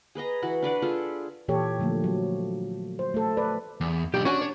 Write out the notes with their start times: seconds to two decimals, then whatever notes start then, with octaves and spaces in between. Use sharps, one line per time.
0.15 G#4 B4 D#5 A#5
0.42 E3 F#4 F#5
0.62 D4 B4 D5 F#5
0.82 F4 G#4 A4
1.48 A#2 E3 G4 A4 C#5
1.79 D3 F3 A3 A#3
2.04 F#3
2.99 C5
3.14 A3 A4
3.37 B4 D5
3.81 E2
4.14 B1 D4 G4
4.25 C#4 D4 F#4 G#5
4.42 C#5